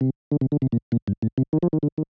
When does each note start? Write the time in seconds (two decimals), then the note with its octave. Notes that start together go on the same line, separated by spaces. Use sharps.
0.01 C3
0.32 D3
0.41 C3
0.52 D3
0.62 C3
0.72 A#2
0.92 A#2
1.08 G2
1.22 A2
1.38 C3
1.53 D#3
1.63 F3
1.73 D#3
1.83 D3
1.98 D#3